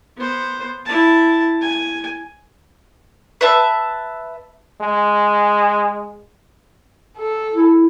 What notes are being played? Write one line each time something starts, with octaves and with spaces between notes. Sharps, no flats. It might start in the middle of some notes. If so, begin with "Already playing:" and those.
B3 C5
E4 A5
G#5
B4 E5 A5
G#3
A4
E4